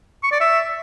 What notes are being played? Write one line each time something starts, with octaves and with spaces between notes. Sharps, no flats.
C#6
D5
E5